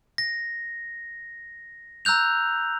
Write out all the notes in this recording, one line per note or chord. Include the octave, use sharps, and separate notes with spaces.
A#6
A#5 E6 F#6 G6 F7